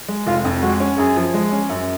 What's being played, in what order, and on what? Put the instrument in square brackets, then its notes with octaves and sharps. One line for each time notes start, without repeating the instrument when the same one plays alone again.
[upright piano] G#3
[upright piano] F1 [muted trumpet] F4
[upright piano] F2
[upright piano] G#3 [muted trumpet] F#4
[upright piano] C#4
[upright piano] F#2 [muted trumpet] G#4
[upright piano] F3
G#3
C#4
F#2